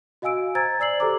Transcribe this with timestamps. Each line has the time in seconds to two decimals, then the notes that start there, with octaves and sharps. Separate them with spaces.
0.22 F#4 D#5 F5 G#5 E6 D7
0.55 C5 G#5 A#5 E6 G#6 A6
0.80 D5 E6 C7 F#7
1.00 G4 A4 C5 A#5 D6